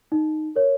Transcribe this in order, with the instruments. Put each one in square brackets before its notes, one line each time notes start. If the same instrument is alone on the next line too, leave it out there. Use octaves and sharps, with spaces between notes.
[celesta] D#4
A#4 C#5